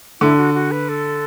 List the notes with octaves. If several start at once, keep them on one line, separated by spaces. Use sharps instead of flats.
D3 E4
F#4
F#4
B4
A4